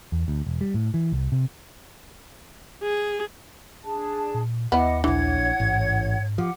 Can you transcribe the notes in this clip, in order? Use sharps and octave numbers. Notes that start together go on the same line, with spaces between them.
E2
D2
E1
G3
A2
E3
C2
C3
G#4
D4 G#4 A5
A#2
D#2 B3 E4 D#5 F#5 D6
A#1 E3 D4 C#5 F#5 G#6
A1 G#2
F3 G4 F#5 D6